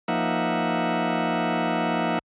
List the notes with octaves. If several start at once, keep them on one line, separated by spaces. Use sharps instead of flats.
F3 A#3 D#4 E5 F#5